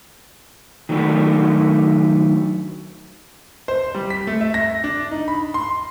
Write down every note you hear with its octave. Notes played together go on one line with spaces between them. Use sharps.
D#3 F#3 A3 D4 E4
C5
G3
B6
A3
E5
A#6
D4
D#4
B5
C6